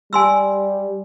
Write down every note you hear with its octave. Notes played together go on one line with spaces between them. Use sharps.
G3 G#5 C6 E6